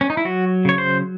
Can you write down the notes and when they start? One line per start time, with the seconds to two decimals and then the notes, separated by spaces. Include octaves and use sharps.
0.01 C#4
0.10 D#4
0.17 E4
0.25 F#3 F#4
0.65 C#3 C#5
0.78 C5